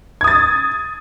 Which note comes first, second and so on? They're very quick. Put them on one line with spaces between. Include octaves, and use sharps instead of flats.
G#6 D#6 A6